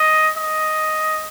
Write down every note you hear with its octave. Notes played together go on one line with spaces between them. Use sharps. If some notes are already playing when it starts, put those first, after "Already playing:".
Already playing: D#5
D#5